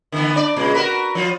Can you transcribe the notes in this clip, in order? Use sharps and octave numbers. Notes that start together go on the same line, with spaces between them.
D3 E3 B3
D4 D5
A#2 C#3 G#3
F#4 A#4 B4
F3 F4